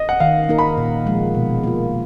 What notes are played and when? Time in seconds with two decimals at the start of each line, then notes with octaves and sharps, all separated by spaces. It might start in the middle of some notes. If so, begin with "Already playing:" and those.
Already playing: D#5
0.09 F#5
0.20 D#3 F5
0.49 A#3 D#4 A#4
0.58 B5
0.78 A#2
1.06 F3 G#3
1.35 B2
1.63 A#3 F4